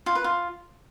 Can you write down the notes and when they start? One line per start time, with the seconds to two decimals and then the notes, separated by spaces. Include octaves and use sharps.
0.06 F4
0.15 B4
0.24 F4